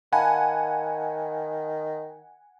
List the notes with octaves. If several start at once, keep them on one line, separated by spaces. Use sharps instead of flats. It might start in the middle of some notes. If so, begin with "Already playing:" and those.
D#3 F5 F#5 G#5 A5 B5